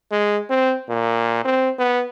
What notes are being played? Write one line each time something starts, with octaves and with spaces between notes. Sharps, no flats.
G#3
C4
A#2
C4
B3